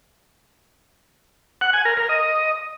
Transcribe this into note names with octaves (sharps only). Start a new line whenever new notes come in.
F#5
G#5
A#4
A#4
D#5